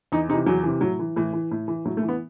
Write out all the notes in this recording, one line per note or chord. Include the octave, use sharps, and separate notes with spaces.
E2 D#4
C3 D#4
E3
E2 F#3
C3 E3
A2 F#3
E3
A2 E3
E3
A2
E3
A2 F#3
A3
E3
B3